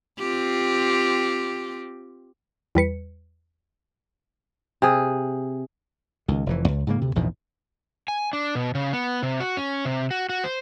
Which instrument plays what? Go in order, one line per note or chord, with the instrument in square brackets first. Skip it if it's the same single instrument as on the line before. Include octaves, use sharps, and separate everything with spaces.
[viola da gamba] C4 F4 G4
[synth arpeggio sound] E2 G3 B4 C#7
[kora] C3 G#4
[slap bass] C#2 D#3
F1 F2 E3
C#2
G#2 C#3 A#3
D2 C3
A#1 E2 G#2 B2
[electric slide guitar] G#5
D4
B2
C#3
B3
C3
F#4
C#4
C3
F#4
F#4
C5